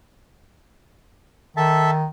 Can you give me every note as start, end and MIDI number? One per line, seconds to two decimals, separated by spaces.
1.57 2.07 51
1.57 1.91 69
1.57 1.91 76
1.57 1.91 81